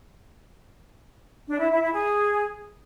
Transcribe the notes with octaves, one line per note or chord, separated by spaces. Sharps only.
D4
E4
E4
E4
G#4